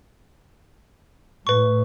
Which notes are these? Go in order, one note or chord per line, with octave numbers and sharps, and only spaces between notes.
A2 B4 C#6